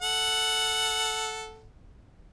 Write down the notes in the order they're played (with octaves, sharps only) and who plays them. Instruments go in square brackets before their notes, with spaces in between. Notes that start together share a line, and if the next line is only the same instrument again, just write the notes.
[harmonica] A4 F#5